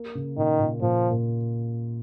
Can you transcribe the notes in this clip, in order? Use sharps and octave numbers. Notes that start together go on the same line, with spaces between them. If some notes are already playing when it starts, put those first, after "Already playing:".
Already playing: A#3
C#3
A#2 D#3
A#2
A#2 F3
A#2